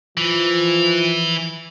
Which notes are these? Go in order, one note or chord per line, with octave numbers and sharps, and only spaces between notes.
E3 F3